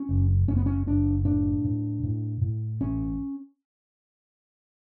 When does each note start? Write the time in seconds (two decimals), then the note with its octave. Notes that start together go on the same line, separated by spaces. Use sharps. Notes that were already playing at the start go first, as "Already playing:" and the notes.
Already playing: C#4
0.09 F#1
0.48 F#1 C#4
0.57 B3
0.66 C#4
0.87 F#1 D4
1.25 A2 D4
1.64 A2
2.03 A2
2.41 A2
2.81 A1 C#4